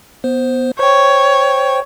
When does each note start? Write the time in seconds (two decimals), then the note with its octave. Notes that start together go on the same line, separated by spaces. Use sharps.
0.24 B3 C5
0.79 C5 C#5 G5